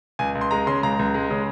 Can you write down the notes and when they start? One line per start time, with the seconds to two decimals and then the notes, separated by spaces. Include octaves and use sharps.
0.19 C#2 G#5
0.35 C#2
0.41 C6
0.51 G#3 A#5
0.67 C#3 C6
0.83 C#2 A#5
0.99 C#2
1.14 G#3
1.30 C#3